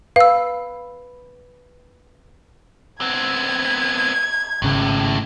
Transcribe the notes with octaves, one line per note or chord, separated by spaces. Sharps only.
B4 F5 E6
B3 C4 G#6
G#1 D#2 A2 C#3